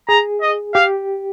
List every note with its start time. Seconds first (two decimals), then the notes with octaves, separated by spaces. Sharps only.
0.09 G#4 A#5
0.41 D#5
0.74 G4 F5